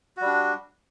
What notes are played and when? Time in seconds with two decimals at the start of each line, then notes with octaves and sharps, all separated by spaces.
0.17 F#4
0.21 G3
0.26 D4